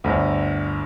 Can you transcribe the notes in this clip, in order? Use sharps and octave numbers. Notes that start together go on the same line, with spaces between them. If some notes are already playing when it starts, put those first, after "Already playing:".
G1 D2